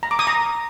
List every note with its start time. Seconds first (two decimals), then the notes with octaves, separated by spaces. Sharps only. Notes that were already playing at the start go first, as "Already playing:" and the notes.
0.03 A#5
0.11 D6
0.19 D#6
0.27 A#5